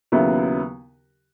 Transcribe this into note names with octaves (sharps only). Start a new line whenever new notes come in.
D#2 C#3 F#3 B3 E4